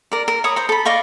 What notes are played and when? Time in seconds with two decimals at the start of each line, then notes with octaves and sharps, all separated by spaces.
0.12 A#4 D5
0.28 A#4
0.44 C#5 A#5 B5 D#6
0.56 C5 A#5
0.69 A4 B5
0.85 D5 D#5 F5 C#6